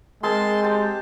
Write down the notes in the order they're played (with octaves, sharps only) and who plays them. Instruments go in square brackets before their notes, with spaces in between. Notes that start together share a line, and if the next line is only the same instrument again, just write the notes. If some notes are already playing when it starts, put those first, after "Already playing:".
[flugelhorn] G#3 [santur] C4 G#4 A#4 [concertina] A5 C6
[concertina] G4 [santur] C5 A5